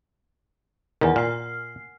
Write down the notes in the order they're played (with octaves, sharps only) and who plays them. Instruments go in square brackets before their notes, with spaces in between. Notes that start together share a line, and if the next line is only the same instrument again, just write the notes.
[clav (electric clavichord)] E2 D#3 [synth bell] A#4 F#5 G#5
[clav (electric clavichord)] A#2 [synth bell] F6 C7